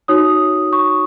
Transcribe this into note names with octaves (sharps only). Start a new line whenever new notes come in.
D#4 F#4 C#5 D#6
C#6